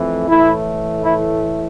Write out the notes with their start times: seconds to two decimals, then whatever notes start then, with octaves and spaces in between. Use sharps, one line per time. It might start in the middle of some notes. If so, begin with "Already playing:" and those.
Already playing: F2 E3 A3
0.29 A2 E3 A3 E4
1.04 E4